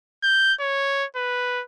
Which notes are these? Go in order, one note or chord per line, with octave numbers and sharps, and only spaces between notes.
G6
C#5
B4